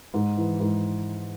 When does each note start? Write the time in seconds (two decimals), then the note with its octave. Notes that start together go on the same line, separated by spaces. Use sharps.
0.14 G#2
0.37 E3
0.60 G#2